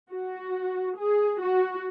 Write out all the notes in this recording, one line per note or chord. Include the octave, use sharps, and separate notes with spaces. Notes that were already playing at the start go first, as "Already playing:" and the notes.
F#4
G#4
F#4